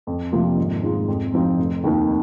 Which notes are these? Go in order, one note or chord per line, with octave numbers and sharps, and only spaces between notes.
F2
C3 F3 A#3 F4
G#1
G#2 G#3 F4
F2
F3 C4 D#4
F1
D#2 D#3 A#3 D#4